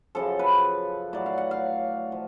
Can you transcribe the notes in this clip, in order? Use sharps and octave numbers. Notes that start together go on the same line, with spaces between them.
F#2 C#3 F3 A4
B4
A2 F#3 D5
F5
F#5
F5
F3